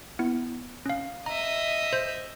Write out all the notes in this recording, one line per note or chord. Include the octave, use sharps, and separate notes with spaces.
B3 E4
C#4 F5
D#5 E5 A#5
C5 G6